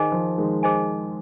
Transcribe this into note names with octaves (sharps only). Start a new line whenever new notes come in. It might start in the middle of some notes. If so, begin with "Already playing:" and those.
Already playing: D#3 G#4 C5 D#5 G#5
F3
D#3 G#3
G#4 C5 D#5 G#5